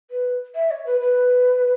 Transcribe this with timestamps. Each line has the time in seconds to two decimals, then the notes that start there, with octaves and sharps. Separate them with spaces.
0.11 B4
0.55 E5
0.71 C#5
0.86 B4
1.00 B4